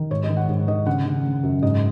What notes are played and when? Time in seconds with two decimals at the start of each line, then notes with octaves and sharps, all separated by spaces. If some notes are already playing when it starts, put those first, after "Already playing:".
Already playing: D#3
0.11 G#2 C#5
0.24 D#5
0.30 D#3
0.37 F#5
0.49 G#2
0.68 D#3 D#5
0.86 C#3 F#5
1.06 C#3
1.25 C#3
1.43 F#2
1.63 G#2 D#5